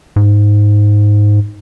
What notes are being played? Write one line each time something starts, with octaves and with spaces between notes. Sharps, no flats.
G#2